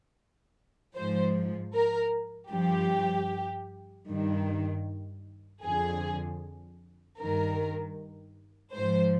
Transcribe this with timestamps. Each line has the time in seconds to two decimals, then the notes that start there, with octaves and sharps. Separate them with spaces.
0.95 G#2 F3 C5
1.75 A#4
2.51 G2 F3 G4
4.08 G2 D#3
5.64 F2 D3 F3 G#4
7.19 G2 D#3 A#4
8.75 G#2 F3 C5